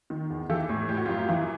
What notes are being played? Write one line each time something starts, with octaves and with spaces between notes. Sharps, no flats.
D#3
E2
E3 G4 A4
A2
A2 G4
F#4
F#2 F4 G4
E3